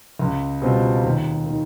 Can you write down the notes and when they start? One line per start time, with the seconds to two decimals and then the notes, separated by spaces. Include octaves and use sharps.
0.19 C#2
0.62 B2 G3 C4 F4
1.04 D#2
1.46 D#3